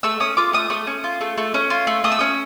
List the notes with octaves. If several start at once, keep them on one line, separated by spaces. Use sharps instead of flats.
A3 E6
C#4 D#6
F4 D6
A3 D#6
A3 D#6
C#4
F4
A3
A3
C#4
F4
A3
A3 D#6
E6
C#4 D#6